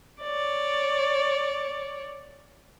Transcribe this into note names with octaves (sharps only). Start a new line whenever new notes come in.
C#5 D5